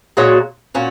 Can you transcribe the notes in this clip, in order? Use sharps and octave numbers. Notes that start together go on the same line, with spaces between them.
A#2 G#3 F#4 C#5
A#2 C#4 F#4